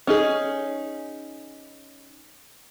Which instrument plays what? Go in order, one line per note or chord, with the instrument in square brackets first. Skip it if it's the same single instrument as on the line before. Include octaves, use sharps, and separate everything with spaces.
[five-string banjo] C#4 D#4 G#4